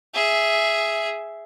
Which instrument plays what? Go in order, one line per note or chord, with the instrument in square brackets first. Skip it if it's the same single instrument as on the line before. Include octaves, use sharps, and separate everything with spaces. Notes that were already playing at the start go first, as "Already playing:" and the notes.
[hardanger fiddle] G#4 E5